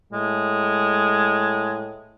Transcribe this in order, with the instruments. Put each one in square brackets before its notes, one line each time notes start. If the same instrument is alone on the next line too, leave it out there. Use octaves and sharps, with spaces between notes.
[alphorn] A2 [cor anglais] G#3